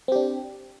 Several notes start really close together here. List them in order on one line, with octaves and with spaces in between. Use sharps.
C4 G4 D4